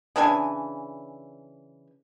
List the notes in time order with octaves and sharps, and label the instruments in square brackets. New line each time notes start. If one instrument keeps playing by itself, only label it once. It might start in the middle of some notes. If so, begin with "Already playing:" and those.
[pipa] C#3 E3 D4 G#5